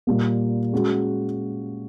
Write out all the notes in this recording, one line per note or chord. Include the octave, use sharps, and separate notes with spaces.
A#2 G3 A#3
G#3 C#4 F#4